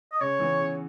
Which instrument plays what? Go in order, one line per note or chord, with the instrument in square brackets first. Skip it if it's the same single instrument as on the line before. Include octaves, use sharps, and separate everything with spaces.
[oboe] D#5
[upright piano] C#3 [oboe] C#5
[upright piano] E3 B3
C#3